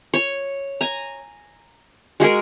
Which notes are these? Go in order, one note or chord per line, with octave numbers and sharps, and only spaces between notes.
C#5
G#5 A#5
G#3 F#4 G#4 A#4